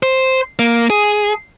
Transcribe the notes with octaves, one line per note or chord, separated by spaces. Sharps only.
C5
A#3
G#4